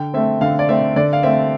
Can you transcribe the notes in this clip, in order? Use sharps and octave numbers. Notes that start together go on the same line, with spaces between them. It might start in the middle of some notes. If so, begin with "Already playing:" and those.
Already playing: D3 G5
A3 C4 E5
D3 F5
D5
A3 C4 E5
D3 D5
F5
A3 C4 E5